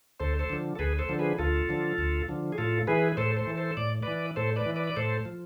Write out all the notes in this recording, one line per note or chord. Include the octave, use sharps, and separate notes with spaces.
D2 A4 C5
A4 C5
D3 F3
A4
D2 G#4 B4
A4 C5
D3 F3
G#4 B4
D2 F4 A4
D3 F3
D2
D3 F3
G#4
A2 F4 A4
E3 G#4 B4
A2 A4 C5
A4 C5
E3
A4 C5
A2 D5
E3 B4 D5
A2 A4 C5
B4 D5
E3
B4 D5
D5
A2 A4 C5
F3